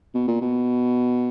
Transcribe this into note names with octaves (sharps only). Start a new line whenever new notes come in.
B2
A#2
B2